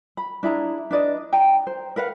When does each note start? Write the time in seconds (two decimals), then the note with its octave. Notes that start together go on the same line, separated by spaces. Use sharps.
0.17 B5
0.43 D4 E4 G#4 A#5
0.91 D4 B4 D5 D#5
1.33 G5 A#5
1.67 C5
1.96 A#4 B4 F5 F#5